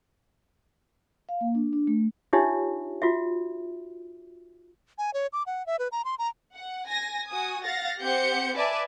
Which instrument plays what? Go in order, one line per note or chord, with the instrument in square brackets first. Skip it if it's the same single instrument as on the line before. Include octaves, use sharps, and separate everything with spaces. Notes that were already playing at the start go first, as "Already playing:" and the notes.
[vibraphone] F5
A#3
D4
D4
A3
[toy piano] D4 D#4 F4 G4 C#5 E5
F4 F#4 E5
[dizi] G#5
C#5
D6
F#5
E5
B4
A#5
C6
A#5
[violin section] F#5
G#5 A#6
F#4 G#5 D#6
F5 F#5 A6 A#6
C4 G4 F#5 G6 C#7
B4 D5 E5 G#5 A5